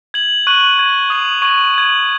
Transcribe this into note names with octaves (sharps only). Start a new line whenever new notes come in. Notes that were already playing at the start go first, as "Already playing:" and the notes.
G#6 F#7
C#6 F#6 D#7 F#7
C#6 G#6 D#7
D#6 G#6 F#7
C#6 G#6 F#7
G#6 F#7